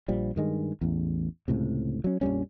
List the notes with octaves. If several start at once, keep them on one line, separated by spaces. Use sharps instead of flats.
A#1 F3 G3
G2 D#3 G#3
A1 E2
C#2 A2 C3
F#3 C#4
A#1 F2 G3 C#4